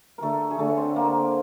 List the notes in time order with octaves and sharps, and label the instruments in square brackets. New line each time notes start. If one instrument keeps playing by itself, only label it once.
[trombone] D3 [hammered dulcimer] A3 A4 A#4
[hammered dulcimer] G#4
[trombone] D3 [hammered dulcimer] A3 A4
[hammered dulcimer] C#5
C4 C5
A#3 A#4